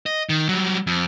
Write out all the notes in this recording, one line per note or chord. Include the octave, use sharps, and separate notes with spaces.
D#5
D#3
F#3 G3
F2